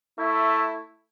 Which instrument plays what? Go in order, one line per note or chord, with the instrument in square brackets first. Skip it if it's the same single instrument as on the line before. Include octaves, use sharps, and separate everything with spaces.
[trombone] A3 [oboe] E4